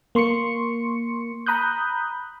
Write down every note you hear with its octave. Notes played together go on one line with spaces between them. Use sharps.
A#3 C6 C#6 C#7
A#5 B5 D#6 F#6 G6